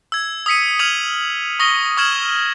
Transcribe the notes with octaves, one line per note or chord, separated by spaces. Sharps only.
E6 G#6
D#6 E6 B6 C#7 D#7
D#6 F6 G#6 D#7 F7 F#7
C#6 D#6 A#6 G7
C#6 D#6 F6 G#6 E7 F#7